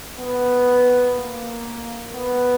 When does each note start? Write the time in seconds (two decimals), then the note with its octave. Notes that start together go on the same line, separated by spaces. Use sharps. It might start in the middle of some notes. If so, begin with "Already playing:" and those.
0.19 B3
1.15 A#3
2.13 B3